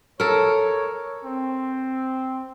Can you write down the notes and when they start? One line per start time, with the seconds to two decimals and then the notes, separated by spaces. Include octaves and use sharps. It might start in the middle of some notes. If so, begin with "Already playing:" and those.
0.20 A4 A#4 C#5
1.24 C4